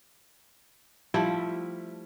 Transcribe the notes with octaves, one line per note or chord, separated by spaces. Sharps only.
F3 G3 A3 E4